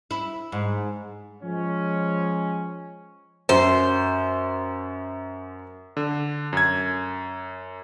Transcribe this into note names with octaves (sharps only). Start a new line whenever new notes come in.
E4
G#2
F3 G#3 C#4
F#2 C5
D3
F#2 G#6